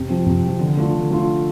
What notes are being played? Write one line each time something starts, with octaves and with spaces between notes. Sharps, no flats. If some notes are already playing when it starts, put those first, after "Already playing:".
Already playing: C3
F3 C4
C3
F3 C4
D3
A3 D4 F4
D3
A3 D4 F4